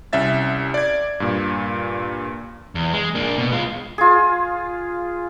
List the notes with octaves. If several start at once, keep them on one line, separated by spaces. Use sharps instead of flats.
C2 C#4 E5 A6
D5 G#6
G2 A#2
E2
G#3
A#3 D4
B2
G#3 F4
F4 G#4